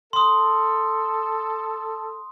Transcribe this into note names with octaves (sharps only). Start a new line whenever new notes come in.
A4 C6 D#6